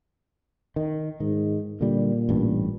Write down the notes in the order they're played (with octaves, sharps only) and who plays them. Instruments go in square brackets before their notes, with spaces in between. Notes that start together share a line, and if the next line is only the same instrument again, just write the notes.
[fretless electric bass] D#3
[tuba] G#2 [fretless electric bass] D#3
[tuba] A#2 [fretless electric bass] D3 G3
[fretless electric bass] A1 G2